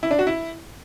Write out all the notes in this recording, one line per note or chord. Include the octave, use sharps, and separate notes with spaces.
E4
D4
F#4
E4